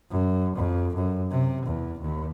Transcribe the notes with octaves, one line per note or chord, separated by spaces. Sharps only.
F#2
F2
F#2
C3
E2
D#2